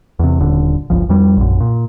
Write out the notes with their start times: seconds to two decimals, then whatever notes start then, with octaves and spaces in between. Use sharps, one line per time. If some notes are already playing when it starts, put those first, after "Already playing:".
0.19 E2 C3
0.40 D#1 D3
0.90 G1 C#2 F3
1.09 F2 G3
1.37 A#1 F#2
1.60 A#2